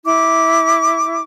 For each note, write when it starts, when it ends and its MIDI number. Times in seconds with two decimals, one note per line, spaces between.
0.04 1.22 64
0.04 1.22 86